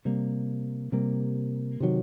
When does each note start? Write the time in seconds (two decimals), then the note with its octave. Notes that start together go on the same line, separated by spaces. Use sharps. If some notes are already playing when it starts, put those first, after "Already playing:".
0.05 C3 G3 A#3
0.92 C3 G3 A#3
1.80 C3 D#3 F#3